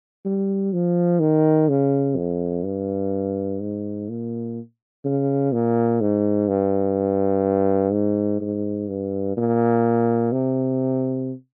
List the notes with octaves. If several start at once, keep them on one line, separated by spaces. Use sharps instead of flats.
G3
F3
D#3
C#3
F2
G2
G#2
A#2
C#3
A#2
G#2
G2
G#2
G#2
G2
A#2
C3